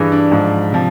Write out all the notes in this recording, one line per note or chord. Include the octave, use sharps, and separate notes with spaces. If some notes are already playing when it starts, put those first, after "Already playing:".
Already playing: G2 E3 G#4
D4
G#2 F3
C3 F3